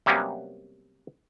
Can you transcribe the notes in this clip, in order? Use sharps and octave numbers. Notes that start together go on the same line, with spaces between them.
C3 F#3 G3 A#3 B3 C#4